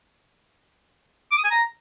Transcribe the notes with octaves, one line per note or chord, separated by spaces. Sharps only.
D6
D#6
G#5
A#5